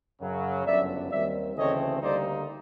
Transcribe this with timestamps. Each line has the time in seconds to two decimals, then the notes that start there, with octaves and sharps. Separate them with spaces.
0.21 F#2 C#3 F#3
0.66 G1 F#2 D3 D5 E5
1.11 D#2 D#3 G3 C4 D5 E5
1.57 D2 C#3 E3 A3 C4 C#5 D#5
2.02 D2 D3 G3 A#3 D#4 C5 D5